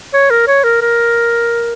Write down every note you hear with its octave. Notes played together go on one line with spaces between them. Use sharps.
C#5
A#4
C#5
A#4
A#4